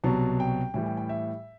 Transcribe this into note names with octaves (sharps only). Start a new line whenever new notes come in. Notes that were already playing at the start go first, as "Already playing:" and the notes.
C2 B2 F#3 A5
G5
A2 E3 G3 G5
G5
G5
E5